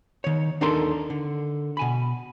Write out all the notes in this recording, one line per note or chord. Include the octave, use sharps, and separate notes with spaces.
D#3 C#5
D#2 D4 D#4 A4 A#4 C6
D3
B2 G#5 B5